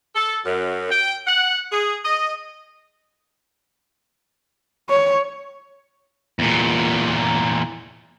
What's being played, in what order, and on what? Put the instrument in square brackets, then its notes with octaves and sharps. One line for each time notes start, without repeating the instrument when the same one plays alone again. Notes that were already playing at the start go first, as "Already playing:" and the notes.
[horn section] A4
F#2
G5
F#5
G#4
D#5
[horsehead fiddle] C#5
[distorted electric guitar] E2 A#2